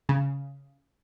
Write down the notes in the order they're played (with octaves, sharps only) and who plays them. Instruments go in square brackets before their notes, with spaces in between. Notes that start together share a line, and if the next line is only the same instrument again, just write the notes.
[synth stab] C#3